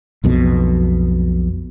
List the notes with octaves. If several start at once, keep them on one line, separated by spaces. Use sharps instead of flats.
B1 F2 B2